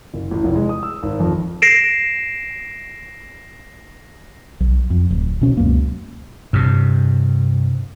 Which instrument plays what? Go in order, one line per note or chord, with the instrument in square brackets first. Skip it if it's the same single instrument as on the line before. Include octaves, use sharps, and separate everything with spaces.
[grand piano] F#1
A1
F1
G#3
D#6
E6
G#1
F2
[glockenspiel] A#6 C7 D7 E7
[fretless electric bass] B1
F2
D1
B2 C#4
C#2 F#2 B2 A#3
[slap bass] G2 C3